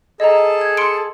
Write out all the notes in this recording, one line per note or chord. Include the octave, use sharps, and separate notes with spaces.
G#4 A4 D#5 A5 A#5
G#6
C6 C#7 D7